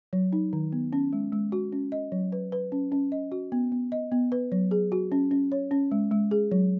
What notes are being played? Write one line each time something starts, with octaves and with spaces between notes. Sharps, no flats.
F#3
D#4
D#3
B3
C#4
G#3
G#3
F#4
C#4
D#5
F#3
B4
B4
C#4
C#4
D#5
F#4
B3
B3
D#5
B3
B4
F#3
G#4
F#4
C#4
C#4
C#5
C#4
G#3
G#3
G#4
F#3